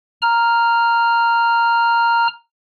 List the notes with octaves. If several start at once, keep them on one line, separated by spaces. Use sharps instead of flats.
A#5 F6